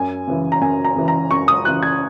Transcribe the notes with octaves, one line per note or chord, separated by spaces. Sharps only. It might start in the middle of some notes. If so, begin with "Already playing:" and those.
Already playing: F#2 G#5
C#3 E3
A#5
F#2 G#5
A#5
C#3 E3
A#5
F#2 C#6
D#6
C#3 E3 F#6
G#6